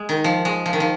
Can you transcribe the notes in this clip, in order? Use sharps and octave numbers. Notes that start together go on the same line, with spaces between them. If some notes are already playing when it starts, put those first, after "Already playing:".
Already playing: G#3
D#3
F3
G#3
F3
D#3
F3